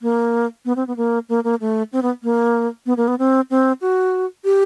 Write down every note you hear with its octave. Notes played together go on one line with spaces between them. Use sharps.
A#3
B3
C4
B3
A#3
A#3
A#3
A3
C4
B3
A#3
B3
A#3
B3
C4
C4
F#4
G4